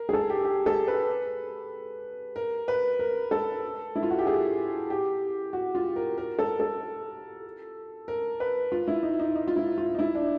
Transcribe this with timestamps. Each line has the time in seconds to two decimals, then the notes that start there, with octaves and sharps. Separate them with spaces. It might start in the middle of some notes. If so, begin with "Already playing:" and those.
Already playing: A#4
0.09 G#4
0.13 A4
0.30 G4
0.45 G4
0.66 A4
0.88 B4
2.36 A#4
2.68 B4
2.99 A#4
3.31 A4
3.96 E4
4.03 F4
4.10 F#4
4.18 G4
4.27 G#4
4.90 G4
5.53 F#4
5.75 F4
5.96 A#4
6.18 A#4
6.39 A4
6.60 A4
8.08 A#4
8.40 B4
8.72 F4
8.88 E4
9.03 D#4
9.20 D#4
9.36 D#4
9.48 F4
9.56 E4
9.78 F4
9.95 D#4
9.99 E4
10.15 D4